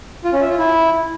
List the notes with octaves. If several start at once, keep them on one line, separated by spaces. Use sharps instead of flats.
F4
C#4
E5
F4
E4